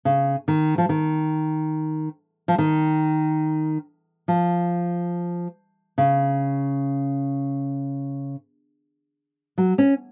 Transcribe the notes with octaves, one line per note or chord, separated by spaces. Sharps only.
C#3
D#3
F3
D#3
F3
D#3
F3
C#3
F#3
C#4